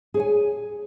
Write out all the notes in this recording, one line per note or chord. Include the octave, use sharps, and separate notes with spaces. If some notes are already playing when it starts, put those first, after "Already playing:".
G#4 C#5 G#5